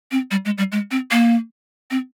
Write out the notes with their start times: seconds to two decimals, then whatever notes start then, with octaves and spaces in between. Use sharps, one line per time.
0.11 C4
0.31 G3
0.45 G#3
0.58 G3
0.72 G#3
0.91 C4
1.11 A#3
1.91 C4